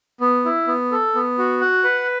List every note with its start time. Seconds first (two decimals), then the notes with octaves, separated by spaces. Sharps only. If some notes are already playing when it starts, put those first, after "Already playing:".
0.21 B3
0.45 E4
0.67 B3
0.92 A4
1.15 B3
1.38 F#4
1.61 F#5
1.84 B4